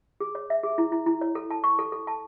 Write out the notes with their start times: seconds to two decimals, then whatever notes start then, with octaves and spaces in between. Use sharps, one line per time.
0.20 G#4
0.35 C#5
0.50 E5
0.63 G#4
0.78 E4
0.92 E4
1.06 E4
1.21 C#5
1.35 A4
1.50 A5
1.64 C#6
1.79 A4
1.92 A4
2.07 A5